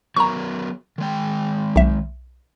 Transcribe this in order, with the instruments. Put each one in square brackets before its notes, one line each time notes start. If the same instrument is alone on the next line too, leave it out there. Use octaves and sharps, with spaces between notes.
[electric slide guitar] F#3 B3 A#4 [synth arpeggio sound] A#5 C#6
[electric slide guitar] D#3 G#3 G5
[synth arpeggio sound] B1 E5